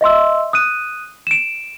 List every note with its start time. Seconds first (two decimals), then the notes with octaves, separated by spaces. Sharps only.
0.01 D#5 E5 C6 E6
0.53 D#6 F#6 D#7
1.27 D7 E7